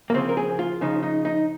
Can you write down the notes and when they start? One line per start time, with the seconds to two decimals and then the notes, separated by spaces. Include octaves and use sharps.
0.10 A#3
0.14 C#3 F3 C4
0.29 A#4
0.37 G#4
0.59 F4
0.81 C#3 F3 D#4
1.03 D#4
1.25 D#4